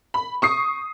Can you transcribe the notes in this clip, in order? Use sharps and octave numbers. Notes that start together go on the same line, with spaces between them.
B5
C#6 D#6 C7